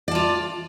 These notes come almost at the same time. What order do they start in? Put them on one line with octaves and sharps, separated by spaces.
D5 A5 F4